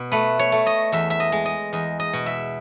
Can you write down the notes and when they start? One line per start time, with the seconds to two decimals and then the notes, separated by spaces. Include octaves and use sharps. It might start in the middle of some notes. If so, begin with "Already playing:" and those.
Already playing: B2
0.12 A3 B4
0.39 C#5
0.52 A3
0.66 D#5
0.92 E2 E5
1.10 E5
1.20 D#5
1.32 G#3
1.46 D#5
1.73 E2 D#5
2.00 D#5
2.13 B2
2.26 E5